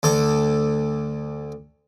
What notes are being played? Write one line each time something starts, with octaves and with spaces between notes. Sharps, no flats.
D2 A4